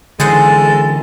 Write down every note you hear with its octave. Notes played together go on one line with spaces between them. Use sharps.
D3 E3 G#3 G#4 A4 C5 F#5